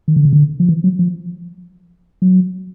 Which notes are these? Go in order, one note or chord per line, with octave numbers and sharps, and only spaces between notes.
D#3
D3
C#3
D3
F3
E3
F#3
F3
F#3